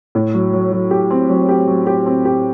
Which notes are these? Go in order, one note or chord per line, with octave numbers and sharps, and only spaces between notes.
A2
F#3
F#3
F#3
G4
C4
F#3
G4
F#3
G4
C4
G4